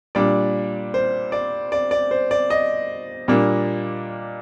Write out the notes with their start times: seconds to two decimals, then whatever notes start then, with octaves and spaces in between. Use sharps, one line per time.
0.15 A#2 G3 D4 D5
0.94 C5
1.32 D5
1.72 D5
1.91 D5
2.11 C5
2.31 D5
2.50 D#5
3.28 A#2 G3 A#3 D4